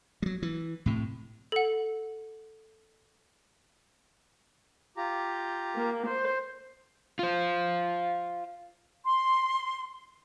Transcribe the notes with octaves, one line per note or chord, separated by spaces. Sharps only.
F#3 G3
E3
A2 C3
A4 F#5
F4 G4 A#5
A#3
C5
F4 C5
C6